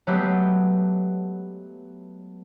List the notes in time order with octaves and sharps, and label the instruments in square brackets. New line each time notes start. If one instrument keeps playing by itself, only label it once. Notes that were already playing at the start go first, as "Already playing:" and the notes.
[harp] F#3 G#3 A3 B3 G4